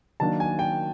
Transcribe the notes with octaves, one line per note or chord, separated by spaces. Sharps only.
D#3 F#3 A#3 D4 A5
G#5
G5